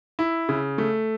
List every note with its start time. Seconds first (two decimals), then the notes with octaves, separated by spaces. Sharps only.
0.19 E4
0.49 C#3
0.78 A3